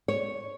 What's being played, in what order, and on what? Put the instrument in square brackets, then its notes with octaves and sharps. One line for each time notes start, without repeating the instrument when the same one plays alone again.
[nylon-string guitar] C#5